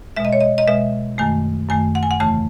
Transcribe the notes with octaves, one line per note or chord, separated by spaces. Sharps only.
B2 G#3 E5
D#5
C#5
D#5
D#5
B2 G#3 E5
F#2 D#3 A3 G#5
F#2 D#3 A3 G#5
F#5
G#5
F#5
E2 C#3 E3 A3 A5